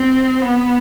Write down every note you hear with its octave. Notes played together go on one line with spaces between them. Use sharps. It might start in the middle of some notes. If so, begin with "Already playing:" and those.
Already playing: C4
B3